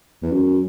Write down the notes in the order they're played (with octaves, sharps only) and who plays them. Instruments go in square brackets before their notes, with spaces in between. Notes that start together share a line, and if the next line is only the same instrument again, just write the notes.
[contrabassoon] E2
F#2